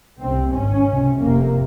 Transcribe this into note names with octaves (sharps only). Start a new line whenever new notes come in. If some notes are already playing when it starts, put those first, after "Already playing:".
C2 C3 C4
G#1 G#2 C#4
C#2 C3
F1 F2 C3 A#3